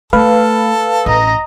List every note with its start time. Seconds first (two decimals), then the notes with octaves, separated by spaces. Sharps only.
0.13 A3 A4 B4 F5
1.06 A1 C#4 D#5 A#5